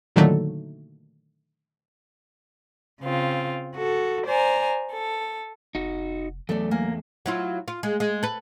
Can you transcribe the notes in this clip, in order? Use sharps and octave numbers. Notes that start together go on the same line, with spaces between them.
A#2 D3 D#3 F#3 A3 A#3
C#3 C4 F4
F#4 A4
C5 D5 G#5 A#5
A4
F1 D#4 F#4
E2 F#3 A3 A4 D5
A#3 G#5
F#3 E4 F4
F4
G#3
G#3
A4 B4